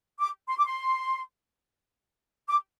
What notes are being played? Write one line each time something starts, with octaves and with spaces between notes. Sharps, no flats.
D6
C6
D6
C6
D6